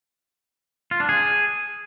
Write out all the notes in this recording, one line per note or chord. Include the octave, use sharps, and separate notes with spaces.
F4
D4
G#4